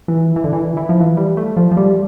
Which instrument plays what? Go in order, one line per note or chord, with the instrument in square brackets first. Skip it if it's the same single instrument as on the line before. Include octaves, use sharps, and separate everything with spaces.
[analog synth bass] E3
E3
D3
E3
E3
F3
E3
G3
A3
F3
F3
G3